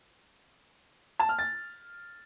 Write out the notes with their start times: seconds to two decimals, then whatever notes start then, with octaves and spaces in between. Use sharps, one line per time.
1.20 A5
1.29 F6
1.39 A6